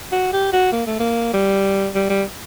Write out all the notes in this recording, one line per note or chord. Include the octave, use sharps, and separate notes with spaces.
F#4
G4
F#4
A#3
A3
A#3
G3
G3
G3